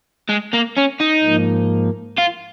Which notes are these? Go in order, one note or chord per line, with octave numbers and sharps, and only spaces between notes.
G#3
A#3
C#4
D#4
G#2 F3 A#3
F4